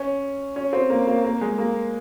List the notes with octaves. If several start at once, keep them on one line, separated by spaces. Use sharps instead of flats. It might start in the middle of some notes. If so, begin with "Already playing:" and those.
Already playing: C#4
C#4
C4
A#3
A#3
A#3
G#3
A#3